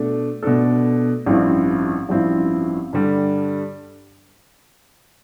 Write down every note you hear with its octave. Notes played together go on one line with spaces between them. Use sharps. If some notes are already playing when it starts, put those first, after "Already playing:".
Already playing: B2 A3 D4 A4
B2 A3 D4 A4
A1 G2 F3 C4 E4
A1 G2 F3 C4 E4
G2 D3 G3